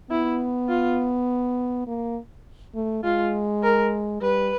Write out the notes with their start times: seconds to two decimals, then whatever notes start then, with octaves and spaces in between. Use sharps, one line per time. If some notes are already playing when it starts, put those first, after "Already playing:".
0.10 B3 E4
0.68 F4
1.87 A#3
2.75 A3
3.04 G#3 F4
3.63 A#4
4.21 G3 B4